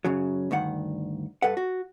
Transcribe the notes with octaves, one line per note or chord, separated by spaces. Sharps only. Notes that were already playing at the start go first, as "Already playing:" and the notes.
F#2 C#3 F#3
D2 G2 D#3 F#5
G2 A4 B4 F#5
F#4